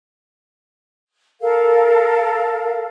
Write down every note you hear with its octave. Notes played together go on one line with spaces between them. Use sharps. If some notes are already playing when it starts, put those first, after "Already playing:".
A4 A#4 F5